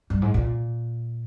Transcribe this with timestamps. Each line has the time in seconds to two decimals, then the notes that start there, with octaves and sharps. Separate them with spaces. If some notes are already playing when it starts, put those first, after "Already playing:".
0.10 G2
0.22 G#2
0.34 A#2